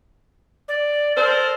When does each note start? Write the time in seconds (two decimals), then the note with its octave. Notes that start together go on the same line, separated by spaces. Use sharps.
0.68 D5
1.17 A4 A#4 C5 D5